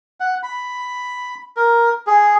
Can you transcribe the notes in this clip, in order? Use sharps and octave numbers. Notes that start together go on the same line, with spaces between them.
F#5
B5
A#4
G#4